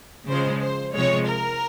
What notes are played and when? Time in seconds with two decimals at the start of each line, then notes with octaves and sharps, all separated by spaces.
0.28 C#3 F3 G#3 C5
0.61 C5
0.94 C3 F3 G#3 C#5
1.27 A#4